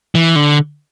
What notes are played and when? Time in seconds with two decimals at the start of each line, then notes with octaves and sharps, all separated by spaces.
0.15 E3
0.36 D3